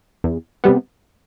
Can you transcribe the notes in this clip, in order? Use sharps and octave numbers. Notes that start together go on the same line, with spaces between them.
E2
C3 G3 B3